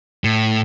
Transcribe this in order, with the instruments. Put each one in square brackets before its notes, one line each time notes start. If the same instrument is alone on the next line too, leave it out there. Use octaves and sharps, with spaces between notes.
[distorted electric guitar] A2